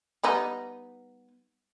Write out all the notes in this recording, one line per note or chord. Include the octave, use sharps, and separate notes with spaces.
G3 B3 D#4